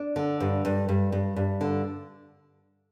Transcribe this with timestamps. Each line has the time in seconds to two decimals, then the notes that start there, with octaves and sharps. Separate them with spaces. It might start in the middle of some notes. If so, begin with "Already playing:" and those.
Already playing: D4
0.16 D3
0.40 G2
0.65 G2
0.89 G2
1.12 G2
1.36 G2
1.61 D3